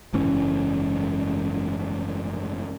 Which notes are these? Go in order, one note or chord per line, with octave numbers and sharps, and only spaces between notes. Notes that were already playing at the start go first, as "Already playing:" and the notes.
F#1 G#2 E3 C#4